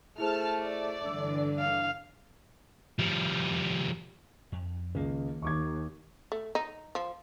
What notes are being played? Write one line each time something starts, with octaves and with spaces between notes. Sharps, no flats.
A3 E4 G#4 C5 A5 F6
D5
G2 D3 E3 D6 E6
F5
F3 G3
F2
C#2 D#3 A#3
D#2 C#6 D6 G#6
A3
D#4
F3